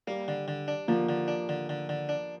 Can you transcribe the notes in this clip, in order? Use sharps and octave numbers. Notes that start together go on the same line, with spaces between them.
G3 A#3
D3
D3
D4
D3 F3 A#3
D3
D4
D3
D3
D3
D4